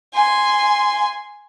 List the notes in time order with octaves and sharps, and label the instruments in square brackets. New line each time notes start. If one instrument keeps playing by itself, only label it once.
[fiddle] G#5 C6